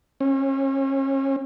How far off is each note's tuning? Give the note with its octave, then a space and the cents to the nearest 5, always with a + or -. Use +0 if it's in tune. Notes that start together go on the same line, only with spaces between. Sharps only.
C#4 -35